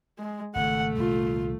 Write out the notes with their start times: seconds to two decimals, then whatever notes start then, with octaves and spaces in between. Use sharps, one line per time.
0.19 G#3
0.55 G#1 G#2 C#3 A3 F#5
0.98 C2 A#2 D#3 F4